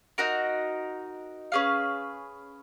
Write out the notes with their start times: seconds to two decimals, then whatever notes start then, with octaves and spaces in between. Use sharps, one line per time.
0.18 D#4 F#4 A#4
1.52 C#4 G#4 B4 F5